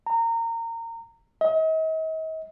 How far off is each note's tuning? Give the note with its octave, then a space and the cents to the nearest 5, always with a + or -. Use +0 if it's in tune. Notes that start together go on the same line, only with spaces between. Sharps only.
A#5 -25
D#5 +40